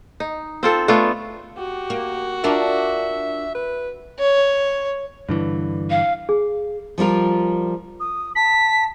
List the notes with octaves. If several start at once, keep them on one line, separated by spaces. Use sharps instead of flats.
D#4
C4 F4 A4
A3 B3 D4 F4
F#4 G4
A#3
D4 F4 A#4 E5
B4
C#5
G2 D3 E3
F5
G#4
F3 G3 F4 A#4
D#6
A5 B6